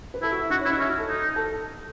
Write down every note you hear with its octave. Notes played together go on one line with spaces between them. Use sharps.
B4
E4 A4
F#4
E4
D#4 F#4
C#4
E4
D#4
C#4 E4
F#4
A4
D#4
A4